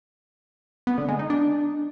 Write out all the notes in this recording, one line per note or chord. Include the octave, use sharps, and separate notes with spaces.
B3
D3
G#3
D#4
D4